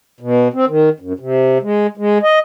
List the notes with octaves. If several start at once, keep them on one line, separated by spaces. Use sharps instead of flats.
B2
C4
D#3
F#2
C3
G#3
G#3
D#5